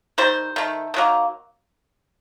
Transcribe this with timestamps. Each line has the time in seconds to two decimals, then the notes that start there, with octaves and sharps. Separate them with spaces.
0.18 D#3 G3 C5
0.56 D#3 A3
0.94 D#3 F#3 A#3